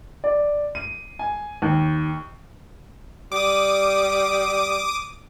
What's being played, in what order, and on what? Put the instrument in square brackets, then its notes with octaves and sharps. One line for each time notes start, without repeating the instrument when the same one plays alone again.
[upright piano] D5
D#7
G#5
D#2
[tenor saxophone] G3 [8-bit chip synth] D6 D#6